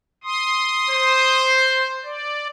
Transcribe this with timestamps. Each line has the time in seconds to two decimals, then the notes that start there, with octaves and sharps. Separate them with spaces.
0.24 C6 D#6
0.90 C5
2.03 D5